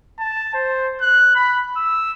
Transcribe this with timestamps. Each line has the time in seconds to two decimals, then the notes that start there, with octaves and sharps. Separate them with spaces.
0.19 A5
0.55 C5
1.01 F#6
1.36 B5
1.77 E6